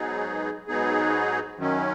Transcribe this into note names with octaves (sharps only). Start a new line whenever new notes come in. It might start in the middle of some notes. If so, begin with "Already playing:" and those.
Already playing: G#2 F#3 B3 D#4 G#4
G#2 F#3 B3 D#4 G#4
F#2 D#3 F#3 C#4